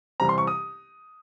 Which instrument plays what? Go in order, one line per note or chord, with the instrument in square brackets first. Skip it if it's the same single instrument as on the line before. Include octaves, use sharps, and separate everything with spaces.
[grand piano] C2 C3 E3 G3 C4 A#5
C6
C#6
D#6